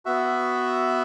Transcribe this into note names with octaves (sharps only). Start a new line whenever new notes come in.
B3 F#4 E5